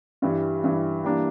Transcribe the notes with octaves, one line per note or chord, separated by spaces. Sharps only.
G2 E3 G3
G2 E3 G3
E3 G3 A#3 D4